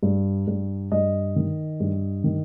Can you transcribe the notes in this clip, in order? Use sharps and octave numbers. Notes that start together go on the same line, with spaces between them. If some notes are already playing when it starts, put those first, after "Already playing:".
G2
G2
G2 D#5
D#3
G2
D#3